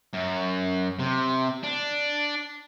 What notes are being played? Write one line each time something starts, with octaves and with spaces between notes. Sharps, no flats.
F#2
C3
D4